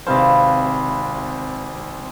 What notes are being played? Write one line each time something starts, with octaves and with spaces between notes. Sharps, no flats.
G#1 C3 B4 C5 F5 A5